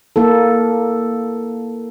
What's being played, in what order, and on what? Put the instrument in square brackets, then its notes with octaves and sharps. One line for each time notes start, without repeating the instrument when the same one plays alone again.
[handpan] A#3 E4 A4